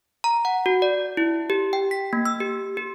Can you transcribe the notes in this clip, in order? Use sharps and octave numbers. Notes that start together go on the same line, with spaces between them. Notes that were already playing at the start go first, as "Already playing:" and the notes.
A#5
F#5
F#4
D5
E4
G4
G5
B6
A#3
E6
G4
G4